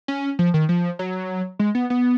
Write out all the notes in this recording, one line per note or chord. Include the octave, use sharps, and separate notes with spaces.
C#4
F3
D#3
F3
F#3
G#3
B3
B3